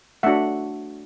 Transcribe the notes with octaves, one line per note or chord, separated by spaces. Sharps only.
A3 D4 F#4 E5 F#5